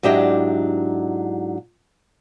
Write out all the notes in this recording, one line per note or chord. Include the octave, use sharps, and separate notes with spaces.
G#2 F#3 D4 E4 G4 D#5